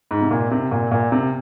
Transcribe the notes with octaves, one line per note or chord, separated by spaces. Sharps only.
G#2
C3
A#2
C3
A#2
A#2
C3